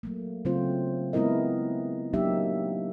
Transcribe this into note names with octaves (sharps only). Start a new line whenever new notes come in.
F#3 A3 A#3
C#3 F#3 A3 C4 F4 C5
G#3 B3 C4 E4 A#4 D#5
F#3 A#3 D4 D#4 G4 E5